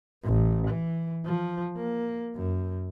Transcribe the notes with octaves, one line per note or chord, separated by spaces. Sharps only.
A1
E3
F3
A#3
F#2